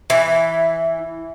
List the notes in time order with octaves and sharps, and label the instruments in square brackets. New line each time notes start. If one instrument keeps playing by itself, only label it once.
[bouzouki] E3